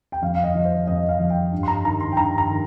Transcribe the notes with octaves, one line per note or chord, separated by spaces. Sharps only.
G5
F2 F5
F5
D#5
F3
C5
F2 D#5
F5
F3
G5
G2
C6
A#5
D#3 A#5
C6
G5
G2 A#5
A#5
D#3